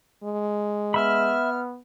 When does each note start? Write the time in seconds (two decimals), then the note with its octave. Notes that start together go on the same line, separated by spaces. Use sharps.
0.24 G#3
0.94 B3 E5 B5 F6